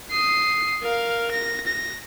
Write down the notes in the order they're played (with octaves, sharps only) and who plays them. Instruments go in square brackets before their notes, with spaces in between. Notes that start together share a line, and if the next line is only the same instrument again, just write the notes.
[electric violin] D#6 C7
A#4 F5
A#6
A#6